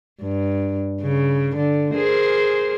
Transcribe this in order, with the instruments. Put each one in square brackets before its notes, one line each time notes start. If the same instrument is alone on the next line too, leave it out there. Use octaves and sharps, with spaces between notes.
[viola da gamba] G2
C#3
D3
G#4 A#4 C5